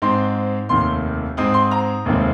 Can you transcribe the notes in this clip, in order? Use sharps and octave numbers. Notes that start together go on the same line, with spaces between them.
G#2 G#3 C4 C6
F1 D#2 D#3 C6
G#2 G#3 C4 D#6
C6
A#5
F1 D#2 D#3 G#3 C4